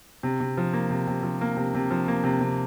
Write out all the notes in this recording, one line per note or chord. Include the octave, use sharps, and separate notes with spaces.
C3
C3
F3
A#3
C3
C3
F3
A#3
C3
C3
F3
A#3
C3
C3